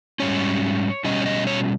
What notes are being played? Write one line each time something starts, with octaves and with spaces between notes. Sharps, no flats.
G#2 G3 C#4 C#5
B2 G3 C#4 D#5
C#5
D#5
C#5